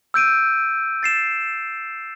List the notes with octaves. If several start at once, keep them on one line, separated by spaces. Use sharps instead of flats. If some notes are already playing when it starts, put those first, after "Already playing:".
E6 G6 D7 D#7
A6 C7 E7